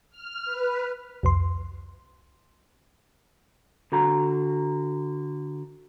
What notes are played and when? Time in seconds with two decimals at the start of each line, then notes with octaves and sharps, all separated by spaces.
0.10 F6
0.45 B4
1.23 C2 F2 C6
3.92 D3 F#4 A#5